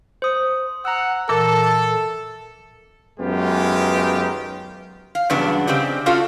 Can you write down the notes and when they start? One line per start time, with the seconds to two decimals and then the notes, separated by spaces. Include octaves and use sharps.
0.22 C5 D#6
0.85 F#5 A#5 E6
1.29 A#2 E3 A4 A#4 E6
3.20 F#2 D#3 G#3 B3 F4 G4
5.15 F5
5.30 E2 G2 C#3 F#3 B3 D4
5.67 C#3 C4 G4 D5 D#5
6.06 C#4 D4 F4 F#4 A4 F5